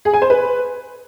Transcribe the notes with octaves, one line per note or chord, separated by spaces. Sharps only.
G#4
G#5
C5
B4